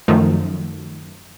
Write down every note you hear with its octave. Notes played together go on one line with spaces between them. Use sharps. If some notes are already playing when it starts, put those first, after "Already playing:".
F#2 D#3 F3 A3